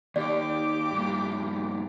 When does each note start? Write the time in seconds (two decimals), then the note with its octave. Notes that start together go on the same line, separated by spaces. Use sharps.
0.16 D#2 G4 D5 D6
0.94 G2 A#2